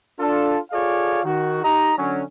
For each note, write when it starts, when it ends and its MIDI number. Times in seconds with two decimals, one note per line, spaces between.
0.19 0.58 62
0.19 0.58 65
0.19 0.58 69
0.71 1.20 65
0.71 1.20 68
0.71 1.20 69
0.71 1.20 73
0.71 1.20 74
0.71 1.20 77
1.23 1.60 51
1.23 1.60 66
1.63 1.92 63
1.63 1.92 67
1.63 1.92 75
1.63 1.92 82
1.98 2.23 50
1.98 2.23 54
1.98 2.23 61